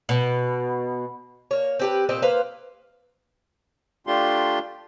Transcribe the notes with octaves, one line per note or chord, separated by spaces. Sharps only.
B2
A#3 C#5
C4 G4 B4
A#2 C4 B4 D#5
A#3 B4 C5 F5
A3 D4 F4 G4 C6